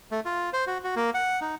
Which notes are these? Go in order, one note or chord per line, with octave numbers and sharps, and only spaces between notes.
A3
F4
C5
F#4
F#4
A#3
F#5
D#4